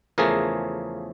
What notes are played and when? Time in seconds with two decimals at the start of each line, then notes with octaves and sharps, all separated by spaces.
0.18 E2 C#3 F3 A3 G#4 A#4